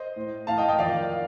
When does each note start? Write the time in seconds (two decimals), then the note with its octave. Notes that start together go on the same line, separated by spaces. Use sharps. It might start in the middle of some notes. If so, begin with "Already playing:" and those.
Already playing: C5 D#5
0.16 A2
0.47 A2 F5 A5
0.58 D#5 G5
0.68 D#5 G5
0.79 F2 D#3 D5 F5